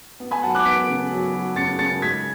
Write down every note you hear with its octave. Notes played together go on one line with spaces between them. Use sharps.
B3
G#5 B5
F#3 F#5 A5
D6 F#6
B3 B6 D7
C#3
F#3
F#3
C#3 A6 C#7
C#3 A6 C#7
G#3 G#6 B6